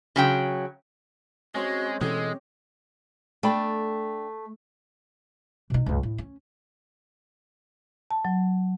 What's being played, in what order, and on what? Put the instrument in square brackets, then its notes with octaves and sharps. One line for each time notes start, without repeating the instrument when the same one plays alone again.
[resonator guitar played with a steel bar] C#3 F#3 G5
[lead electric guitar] G#3 [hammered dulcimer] C4 C#4 [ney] F#4
[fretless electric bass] B2 E3 C#4 [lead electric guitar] G#3 [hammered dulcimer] G4 [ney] A4
[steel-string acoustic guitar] A3 [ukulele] D4 G5 B5
[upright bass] B2 D#4
C#2 G2
A2
C#4
[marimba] A5
F#3